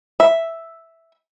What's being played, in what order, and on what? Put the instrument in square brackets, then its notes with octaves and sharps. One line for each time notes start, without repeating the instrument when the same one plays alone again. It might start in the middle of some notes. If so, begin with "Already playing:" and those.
[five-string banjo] E5